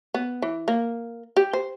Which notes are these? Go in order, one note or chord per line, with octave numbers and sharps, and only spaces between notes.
B3
E3
A#3
G4
C5